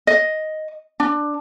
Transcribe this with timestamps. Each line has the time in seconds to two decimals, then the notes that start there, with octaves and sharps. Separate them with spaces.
0.07 D#5
1.00 D4